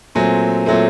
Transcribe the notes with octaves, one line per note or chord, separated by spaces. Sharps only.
A#2 F#3 A3 C4 G#5
A#2 F#3 A3 C4